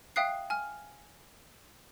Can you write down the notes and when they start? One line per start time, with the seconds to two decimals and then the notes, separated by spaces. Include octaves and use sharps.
0.16 E5 F5 G5 D#6 F#6 C7
0.50 G#5 F6